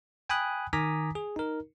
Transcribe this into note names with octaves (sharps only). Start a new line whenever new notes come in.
G5 G#5 B5 D#6 F#6
D#3 G#5 A#5 D6 D#6 B6
G#4
D#4 A#4